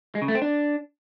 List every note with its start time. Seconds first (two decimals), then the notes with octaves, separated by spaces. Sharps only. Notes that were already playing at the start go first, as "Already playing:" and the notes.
0.15 G#3
0.22 C#3
0.28 A3
0.35 C4
0.42 D4